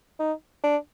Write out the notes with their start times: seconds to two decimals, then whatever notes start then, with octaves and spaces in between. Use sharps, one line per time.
0.19 D#4
0.63 D4